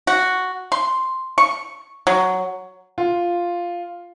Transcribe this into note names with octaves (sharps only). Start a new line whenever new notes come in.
F#4
C6
C#6
F#3
F4